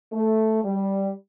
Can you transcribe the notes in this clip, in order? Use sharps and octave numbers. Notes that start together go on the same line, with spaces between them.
A3
G3